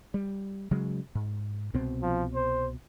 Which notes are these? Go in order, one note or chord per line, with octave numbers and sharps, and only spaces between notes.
G3
C#3 F#3 G#3
G#2
C2 B2 C4
F3
C5